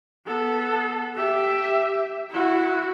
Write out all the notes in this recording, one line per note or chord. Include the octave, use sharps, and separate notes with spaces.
B3 A4
G4 E5
E4 F#4